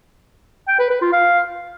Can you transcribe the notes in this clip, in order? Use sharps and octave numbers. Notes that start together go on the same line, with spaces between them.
G5
B4
B4
F4
F5